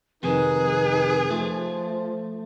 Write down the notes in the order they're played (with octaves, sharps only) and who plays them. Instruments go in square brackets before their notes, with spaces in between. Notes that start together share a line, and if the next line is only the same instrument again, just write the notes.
[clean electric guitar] F2 C3 D#3 [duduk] D#4 [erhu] G#4 [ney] B4
[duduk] F3 [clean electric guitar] A3 [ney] F4